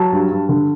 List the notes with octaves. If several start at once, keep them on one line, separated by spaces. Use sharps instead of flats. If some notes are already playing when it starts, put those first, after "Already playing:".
Already playing: F#3 A5
G2
G2
D3